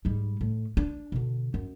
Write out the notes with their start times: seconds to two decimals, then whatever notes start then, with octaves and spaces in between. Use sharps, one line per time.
0.05 G#2 G3
0.41 A2
0.77 D4
1.12 B2 D3
1.54 F#2